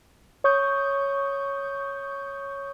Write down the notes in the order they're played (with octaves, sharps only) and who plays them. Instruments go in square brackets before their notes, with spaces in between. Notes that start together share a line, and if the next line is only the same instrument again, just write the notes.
[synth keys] C#5 C#6 D#6 G6